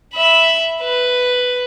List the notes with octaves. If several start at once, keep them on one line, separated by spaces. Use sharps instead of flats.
E5 B5
B4